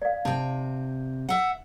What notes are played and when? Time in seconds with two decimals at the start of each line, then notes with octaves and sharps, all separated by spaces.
0.02 D5 F5
0.25 C3 D#4 G5
1.29 E5 F#5